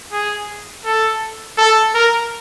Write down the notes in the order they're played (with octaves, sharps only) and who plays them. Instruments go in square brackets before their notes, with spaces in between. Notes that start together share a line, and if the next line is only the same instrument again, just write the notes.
[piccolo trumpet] G#4
A4
A4
A#4